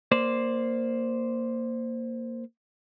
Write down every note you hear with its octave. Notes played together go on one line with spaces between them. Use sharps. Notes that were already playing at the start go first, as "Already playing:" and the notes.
A#3 C5 D5